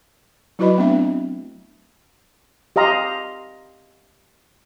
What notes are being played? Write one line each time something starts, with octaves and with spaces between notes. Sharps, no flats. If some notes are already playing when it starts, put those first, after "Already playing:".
F#3 E4 F#4 B4 D#5 B5
A3 B3 C4 D4 E5
G4 D#5 F5 A#5 C6